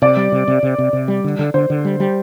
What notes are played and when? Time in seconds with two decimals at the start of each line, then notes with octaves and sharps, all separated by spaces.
0.02 C3 D5
0.17 G3
0.32 C3
0.48 C3
0.63 C3
0.78 C3
0.93 C3
1.08 G3
1.24 D3
1.39 D3
1.54 D3 C5
1.70 D3
1.85 G3
2.00 G3